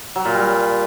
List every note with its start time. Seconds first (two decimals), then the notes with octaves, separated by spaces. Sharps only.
0.16 F#3
0.25 A#2
0.34 G3